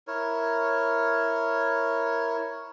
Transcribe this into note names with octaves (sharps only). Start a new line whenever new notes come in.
E4 A#4 C#5